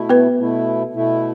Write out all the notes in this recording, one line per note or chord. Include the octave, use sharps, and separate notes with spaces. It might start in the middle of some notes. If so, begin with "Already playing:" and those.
Already playing: B2 A3 E4
B3 B4
B2 A3 E4
B2 A3 E4